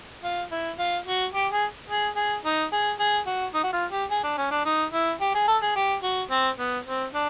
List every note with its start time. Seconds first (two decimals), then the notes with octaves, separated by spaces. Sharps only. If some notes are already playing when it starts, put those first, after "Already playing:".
0.23 F4
0.51 E4
0.79 F4
1.06 F#4
1.34 G4
1.52 G#4
1.90 G#4
2.16 G#4
2.45 D#4
2.72 G#4
2.99 G#4
3.27 F#4
3.54 D#4
3.63 F#4
3.73 F4
3.91 G4
4.10 G#4
4.23 D4
4.37 C#4
4.51 D4
4.65 D#4
4.93 E4
5.21 G4
5.35 G#4
5.48 A4
5.62 G#4
5.76 G4
6.03 F#4
6.30 C4
6.59 B3
6.86 C4
7.14 D4